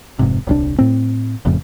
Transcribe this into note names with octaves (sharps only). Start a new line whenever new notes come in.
F1 G#2 C3
D#1 C2 D4
A2 C4
F1 F2 A2 C#3